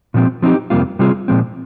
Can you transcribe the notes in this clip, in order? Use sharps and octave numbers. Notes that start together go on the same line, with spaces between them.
A#2 F3 C4
F3 C4 D#4 G4
F2 C3 G3 A#3 F4
C3 G3 C4 F4 G#4
A#2 F3 G#3 C4